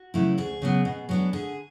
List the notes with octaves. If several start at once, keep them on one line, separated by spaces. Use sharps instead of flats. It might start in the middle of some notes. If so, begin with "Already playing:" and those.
Already playing: F#4
C#3 F#3 A3 E4
D2 G#4
C#3 F#3 B3
B2
F#3 B3 D4
D3 G#4